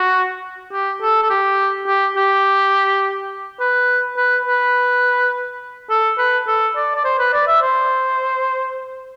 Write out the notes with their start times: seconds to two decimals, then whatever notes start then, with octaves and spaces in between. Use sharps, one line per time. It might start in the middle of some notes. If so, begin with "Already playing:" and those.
Already playing: F#4
0.73 G4
1.02 A4
1.22 A4
1.30 G4
1.87 G4
2.16 G4
3.60 B4
4.17 B4
4.46 B4
5.90 A4
6.18 B4
6.47 A4
6.76 D5
6.95 D5
7.04 C5
7.19 B4
7.33 D5
7.47 E5
7.62 C5